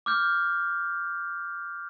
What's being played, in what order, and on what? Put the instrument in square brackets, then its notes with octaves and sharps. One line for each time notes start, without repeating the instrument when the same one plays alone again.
[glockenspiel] D6 F6 G6